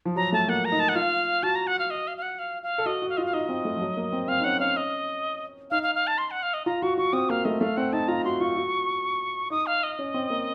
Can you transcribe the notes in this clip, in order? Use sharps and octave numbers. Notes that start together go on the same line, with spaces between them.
F3
F#3 A#5
A3 A5
A#3 F#5
A#5
D#4
A5
F#5
F4 F5
F#4 A5
A#5
F#5
F5
D#5
F5
F5
F#5
F5
F5
A4
F#4 D#5
F#4
F5
F4 D#5
F5
D#4 D#5
C4
A3
F3
F#3
A#3
C4
C4 F5
D#4
C#4 F#5
C#4 F5
D#5
D#4 F5
F5
F5
A5
C6
F#5
F5
D#5
F4 A#5
F#4 C#6
F#4 C#6
C4 D#6
A#3 F5
A3 D#5
A3 F5
C4 F#5
D#4 A5
F4 A#5
F#4 C6
F4 C#6
F#4
D#4 D#6
F5
D#5
C#4
C4
A#3